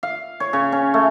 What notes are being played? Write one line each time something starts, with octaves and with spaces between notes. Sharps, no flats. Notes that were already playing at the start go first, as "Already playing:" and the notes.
F5
C#5
C#3
C#4
A3